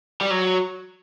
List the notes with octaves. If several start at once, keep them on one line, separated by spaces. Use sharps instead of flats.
G3
F#3